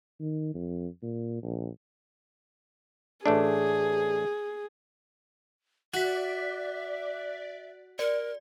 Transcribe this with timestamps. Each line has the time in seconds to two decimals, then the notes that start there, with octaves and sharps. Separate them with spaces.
0.20 D#3
0.54 F2
1.02 A#2
1.43 A#1
3.26 A1 A3 D4 G#4
5.94 F#4 D5 E5 F#6 B6
7.99 A#4 D5